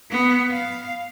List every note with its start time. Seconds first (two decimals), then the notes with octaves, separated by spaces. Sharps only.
0.10 B3
0.51 F5